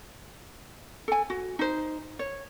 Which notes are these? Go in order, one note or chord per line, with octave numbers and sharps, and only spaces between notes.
A4 G#5
F#4
D#4 C5
C#5